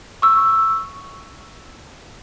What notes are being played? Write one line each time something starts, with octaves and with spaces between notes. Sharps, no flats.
C#6 E6